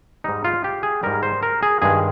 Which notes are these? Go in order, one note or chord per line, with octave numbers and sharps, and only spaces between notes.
G#2 G3 D#4
F4
G4
G#4
G#2 G3 A#4
C5
A#4
G#4
G2 D#3 G#3 G#4